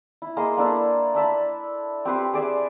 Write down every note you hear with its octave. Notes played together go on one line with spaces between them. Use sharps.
E4
A#3 G#4 C5 D#5
A#3 D4 E4 A4
D4 E5 A5 B5
C4 G4 B4 C5
G#4 D5 E5 G#5